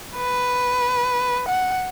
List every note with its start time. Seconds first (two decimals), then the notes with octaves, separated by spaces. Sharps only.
0.17 B4
1.48 F#5